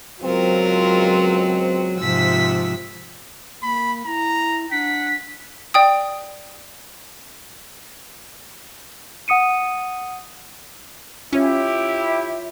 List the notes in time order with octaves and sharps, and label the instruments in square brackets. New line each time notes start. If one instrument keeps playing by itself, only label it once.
[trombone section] C#2 C4 [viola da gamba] F#3 [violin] F4 A#4
[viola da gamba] G#2 C3 F3 [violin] E6 B6
[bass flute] A#3 [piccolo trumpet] B5
[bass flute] E4 [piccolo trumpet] A#5
[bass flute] D4 [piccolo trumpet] F#5 [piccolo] B6
[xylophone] D5 G5 D#6
[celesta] F#5 D#6 C#7 D#7
[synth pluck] C#4 [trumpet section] E4 G4 [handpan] F4 C#5 [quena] E5